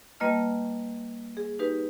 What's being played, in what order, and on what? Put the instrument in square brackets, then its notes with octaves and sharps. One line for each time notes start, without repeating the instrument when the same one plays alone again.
[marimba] G3 A#3 B4 D#5 A5 F6
G#4
D#4 G4 B4